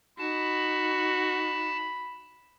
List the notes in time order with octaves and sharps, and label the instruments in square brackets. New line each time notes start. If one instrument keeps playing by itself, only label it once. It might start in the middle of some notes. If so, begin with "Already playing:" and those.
[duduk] D#4 [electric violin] F#4 [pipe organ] A5 [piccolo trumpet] B5